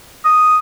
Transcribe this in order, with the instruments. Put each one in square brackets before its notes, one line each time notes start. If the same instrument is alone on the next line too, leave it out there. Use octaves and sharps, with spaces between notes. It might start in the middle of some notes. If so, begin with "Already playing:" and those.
[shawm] D#6